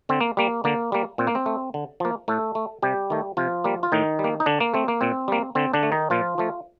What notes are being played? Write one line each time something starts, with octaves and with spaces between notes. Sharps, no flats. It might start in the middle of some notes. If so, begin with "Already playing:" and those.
D3 C4
A#3
G3 A#3
D3 A#3
G3 A#3
A#2 C4
A#3
C4
A3
D3
F3 A#3
A2 A3 A4
A3
C3 G3 G4
D#3 A3
C3 F3 F4
G3 A#3
F4
A2 D#3 D#4
G3
A#3
D#4
D3 D4
A#3
A3 C4
A#3
A#2 C4
G3 A#3
D3 C4
D3 D4
A3
D#3 D#4
A#2 F3 F4
F3 A3